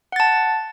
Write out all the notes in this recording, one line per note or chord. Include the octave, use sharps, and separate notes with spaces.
F#5 A5 A6